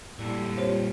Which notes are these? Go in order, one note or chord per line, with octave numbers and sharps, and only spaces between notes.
A#2 G3 E4 A4
C4 F4 G4 C5 C#5